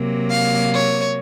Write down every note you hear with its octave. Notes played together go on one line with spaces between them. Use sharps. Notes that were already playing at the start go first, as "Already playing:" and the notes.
Already playing: C3 F#3 A#3
F5
C#5